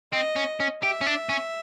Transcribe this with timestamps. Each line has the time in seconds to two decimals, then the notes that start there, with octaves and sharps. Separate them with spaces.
0.13 C4 D#5
0.36 C#4
0.60 C#4
0.83 G4 E5
1.01 C#4
1.06 D4
1.29 C#4